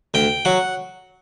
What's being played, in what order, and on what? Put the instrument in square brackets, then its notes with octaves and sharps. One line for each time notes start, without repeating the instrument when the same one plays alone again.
[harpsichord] D2 G5
F#3 F#5